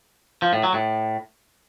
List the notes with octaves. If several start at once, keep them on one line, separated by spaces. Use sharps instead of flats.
F3
A2
F#3
A2